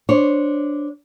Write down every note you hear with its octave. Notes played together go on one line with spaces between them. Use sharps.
D4 C5 C#5